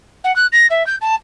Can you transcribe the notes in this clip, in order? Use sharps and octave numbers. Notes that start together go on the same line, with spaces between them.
F#5
F#6
A#6
E5
G6
A5